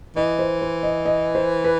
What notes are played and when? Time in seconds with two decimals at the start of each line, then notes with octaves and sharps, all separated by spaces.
0.16 E3 D#5
0.39 C5
0.62 C5
0.83 D#5
1.05 D#5
1.35 C5
1.64 B4